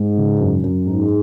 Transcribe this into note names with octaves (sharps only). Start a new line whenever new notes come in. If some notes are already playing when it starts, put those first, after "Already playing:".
Already playing: G#2 G#3
C#3
F#2
F#2
G#2 D#4